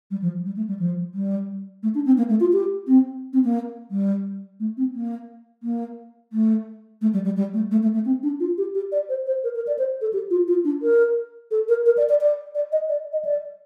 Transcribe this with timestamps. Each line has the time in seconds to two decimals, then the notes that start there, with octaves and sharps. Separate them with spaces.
0.11 G3
0.22 F3
0.45 G3
0.56 A3
0.68 G3
0.79 F3
1.14 G3
1.83 A3
1.95 D4
2.06 C4
2.18 A#3
2.29 A3
2.40 F4
2.53 G4
2.87 C4
3.33 C4
3.44 A#3
3.91 G3
4.60 A3
4.77 C4
4.94 A#3
5.63 A#3
6.33 A3
7.02 A3
7.13 G3
7.25 G3
7.37 G3
7.53 A3
7.71 A3
7.83 A3
7.94 A3
8.05 C4
8.23 D4
8.40 F4
8.58 G4
8.75 G4
8.92 D5
9.09 C5
9.27 C5
9.44 A#4
9.55 A#4
9.67 D5
9.78 C5
10.01 A4
10.13 G4
10.30 F4
10.48 F4
10.64 D4
10.82 A#4
11.51 A4
11.69 A#4
11.86 A#4
11.97 D5
12.09 D5
12.21 D5
12.55 D5
12.72 D#5
12.89 D5
13.13 D#5
13.25 D5